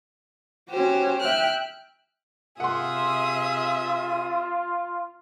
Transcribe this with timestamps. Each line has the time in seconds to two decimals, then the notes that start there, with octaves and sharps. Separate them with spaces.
0.71 C#4 F#4 G4 C5
1.21 E5 G5 F6 F#6
2.60 C3 F4 G#4 E5 F#5 C6 D#6